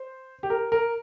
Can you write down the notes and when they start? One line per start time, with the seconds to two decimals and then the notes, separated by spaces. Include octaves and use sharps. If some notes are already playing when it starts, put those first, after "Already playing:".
Already playing: C5
0.43 G4
0.50 A#4
0.72 A#4